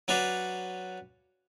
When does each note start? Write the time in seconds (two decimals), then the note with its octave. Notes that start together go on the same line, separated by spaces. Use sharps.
0.08 F#3 C#4 F#4 B4 D5 F5